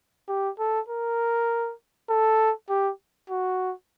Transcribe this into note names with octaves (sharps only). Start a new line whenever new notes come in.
G4
A4
A#4
A4
G4
F#4